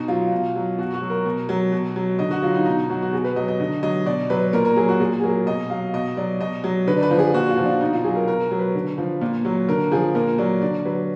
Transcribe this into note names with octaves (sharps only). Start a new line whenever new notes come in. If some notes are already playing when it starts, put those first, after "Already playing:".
Already playing: B2 D#4
F#3 F4
B2
F#3
B2 F#4
F#4
F#3
A#4
B2
F#3
B2
F#3
D3 D#5
F#4
F#3 F4
D#4
B2 D#4
F#3 F#4
F#4
B2 G#4
B4
F#3 D#5
D#5
D3 D#5
F#3 D#5
B2 D5
F#3 B4
A#2 A#4
A#4
F#3 G#4
F#4
A#2 G#4
G#4
F#3 A#4
B2 D#5
F#3 F5
B2 D#5
F#3 D5
B2 D#5
F#3
D3 B4
D5
B4
F3
G#4
A#2 F#4
F4
F3
D4
B2 D#4
F4
F#3 G#4
A#4
B2 A#4
F#3
B4
D3
F3
A#2
F#3
D3 A#4
F3 G#4
A#2 A#4
F#3 D5
D3 D5
F#3 B4